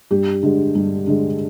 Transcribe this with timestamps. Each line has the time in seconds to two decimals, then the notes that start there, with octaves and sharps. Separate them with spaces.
0.11 G2 G4
0.43 D3 G#3
0.75 G2
1.07 D3 G#3